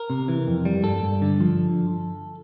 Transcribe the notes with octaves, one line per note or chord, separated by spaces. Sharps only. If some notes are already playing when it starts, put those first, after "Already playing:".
Already playing: A#4
C3
E3
F2
G3
G2 A4
G2
D3
F3